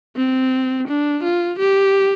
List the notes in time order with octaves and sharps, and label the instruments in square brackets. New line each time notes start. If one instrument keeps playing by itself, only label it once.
[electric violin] C4
D4
F4
G4